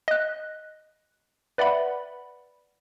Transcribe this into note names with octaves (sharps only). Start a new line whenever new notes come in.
D#5 F#6
B4 D5 E5 F#5 B5